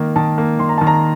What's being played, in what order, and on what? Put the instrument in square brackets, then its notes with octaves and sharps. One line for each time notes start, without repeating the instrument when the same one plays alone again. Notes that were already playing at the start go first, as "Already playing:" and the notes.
Already playing: [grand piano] D#3 A#3
D#3 A5
A#3
D#3 C6
A#5
D#3 A5
A#5